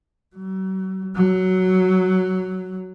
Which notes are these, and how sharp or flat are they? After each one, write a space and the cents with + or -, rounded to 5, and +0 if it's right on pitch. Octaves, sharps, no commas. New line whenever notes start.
F#3 +40
F#3 +5